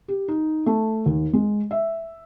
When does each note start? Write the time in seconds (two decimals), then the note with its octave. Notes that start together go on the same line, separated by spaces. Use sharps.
0.08 G4
0.28 D#4
0.66 A3
1.06 D#2
1.33 G#3
1.71 E5